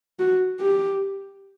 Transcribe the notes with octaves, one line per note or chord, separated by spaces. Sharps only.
F#4
G4